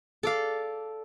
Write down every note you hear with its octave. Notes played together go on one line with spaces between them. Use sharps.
A4 D5 F5